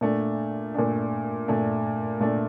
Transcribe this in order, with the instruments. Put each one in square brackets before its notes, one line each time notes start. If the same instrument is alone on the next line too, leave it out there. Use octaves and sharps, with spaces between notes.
[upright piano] A#2 A3 D4
A#2 A3 D4
A#2 A3 D4
A#2 A3 D4